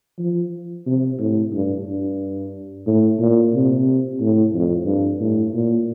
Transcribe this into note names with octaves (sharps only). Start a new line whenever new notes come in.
F3
C3
A2
G2
G2
A2
A#2
C3
A2
F2
G2
A2
A#2